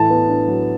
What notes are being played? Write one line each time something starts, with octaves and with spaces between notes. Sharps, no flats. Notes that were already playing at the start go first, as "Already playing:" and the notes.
Already playing: A2 E3 A5
B3
D4
F#3